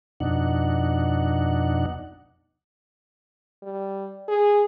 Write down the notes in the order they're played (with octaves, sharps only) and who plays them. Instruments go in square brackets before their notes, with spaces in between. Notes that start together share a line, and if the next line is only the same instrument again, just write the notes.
[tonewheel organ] F2 B2 D4 D#4 F#5
[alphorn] G3
G#4